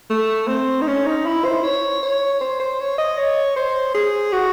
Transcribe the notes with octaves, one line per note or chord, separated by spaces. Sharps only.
A3
C4
D#4
C#4
D#4
E4
C5
C#5
C#5
C5
C5
C#5
D#5
C#5
C5
G#4
F#4